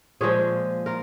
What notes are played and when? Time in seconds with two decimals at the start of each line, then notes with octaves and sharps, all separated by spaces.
0.21 A#2 F3 G#3 G#4 C#5
0.86 F4 A#4